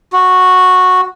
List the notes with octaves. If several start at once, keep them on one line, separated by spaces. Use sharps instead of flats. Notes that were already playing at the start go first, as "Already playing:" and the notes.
F#4